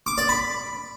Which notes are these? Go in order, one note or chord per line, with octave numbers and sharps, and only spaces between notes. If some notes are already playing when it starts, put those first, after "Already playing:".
D6
D5
B5